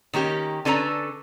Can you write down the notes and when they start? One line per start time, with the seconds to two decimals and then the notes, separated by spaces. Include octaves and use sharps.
0.13 D#3 A#3 C#4 G4
0.65 D3 C#4 D4 A4 B4 A#5